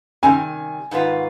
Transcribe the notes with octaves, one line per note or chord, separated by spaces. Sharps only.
C3 D#3 G3 G#5
G#2 D#3 B3 F4 B4